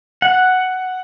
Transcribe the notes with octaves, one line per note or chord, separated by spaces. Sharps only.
F#5